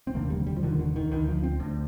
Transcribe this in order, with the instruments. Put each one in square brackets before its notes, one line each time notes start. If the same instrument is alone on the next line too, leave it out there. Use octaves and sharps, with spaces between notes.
[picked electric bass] C4
F1 D#2 D3 A#3
G3
G3
F3
F1 D#2 D3 D#3
D3
D#3
D2 D3 D#3
F3
C4
D2 D3